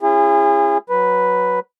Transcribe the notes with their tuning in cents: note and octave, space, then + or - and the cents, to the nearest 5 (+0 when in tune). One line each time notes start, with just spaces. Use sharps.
C#4 -20 E4 +40 G#4 -30
F#3 +0 B4 +0